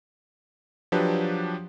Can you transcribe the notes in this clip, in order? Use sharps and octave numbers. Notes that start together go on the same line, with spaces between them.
F3 F#3 D4 G4 B4